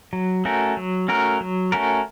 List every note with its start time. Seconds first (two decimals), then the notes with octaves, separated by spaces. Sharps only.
0.13 F#3
0.45 A3 C#4 F#4 A#4
0.77 F#3
1.08 A3 C#4 F#4 A#4
1.41 F#3
1.72 A3 C#4 F#4 A#4